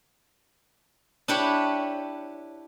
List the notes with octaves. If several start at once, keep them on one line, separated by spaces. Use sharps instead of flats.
D4 E4 G4 B4 C#5